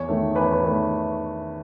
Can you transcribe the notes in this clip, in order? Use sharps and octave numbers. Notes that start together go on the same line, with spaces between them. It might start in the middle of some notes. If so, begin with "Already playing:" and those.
Already playing: E2 C#5
D#3 A3
E2 B4
C#5
B4
D#3 A3